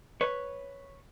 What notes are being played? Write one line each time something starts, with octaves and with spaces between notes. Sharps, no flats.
B4 C#5